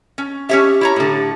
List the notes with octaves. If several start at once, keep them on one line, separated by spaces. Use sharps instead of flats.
C#4
C#4 G4 C#5 E5
E4 C#5 A#5
A2 D3